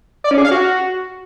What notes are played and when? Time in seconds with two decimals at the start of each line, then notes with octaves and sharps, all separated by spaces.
0.24 D5
0.31 C#4
0.38 G#4
0.45 F5
0.51 F#4